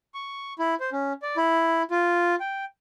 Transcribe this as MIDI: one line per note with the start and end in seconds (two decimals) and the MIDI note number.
0.14 0.53 85
0.59 0.75 64
0.80 0.90 72
0.92 1.13 61
1.22 1.36 74
1.37 1.83 64
1.91 2.36 65
2.40 2.65 79